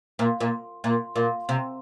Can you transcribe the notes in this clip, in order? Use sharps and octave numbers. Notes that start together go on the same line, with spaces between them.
A#2
A#2
A#2
A#2
C3